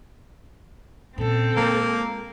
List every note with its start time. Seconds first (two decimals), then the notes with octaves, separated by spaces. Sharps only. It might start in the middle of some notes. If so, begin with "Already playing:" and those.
1.18 A#2 C#3 C4 A4
1.57 G#3 A#3 F4